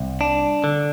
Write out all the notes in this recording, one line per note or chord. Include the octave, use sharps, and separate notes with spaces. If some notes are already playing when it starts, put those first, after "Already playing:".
Already playing: C2
D4
D3